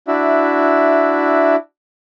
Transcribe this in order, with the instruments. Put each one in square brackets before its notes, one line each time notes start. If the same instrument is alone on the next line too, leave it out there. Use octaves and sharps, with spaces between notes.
[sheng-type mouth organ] D4 E4 F#4 E5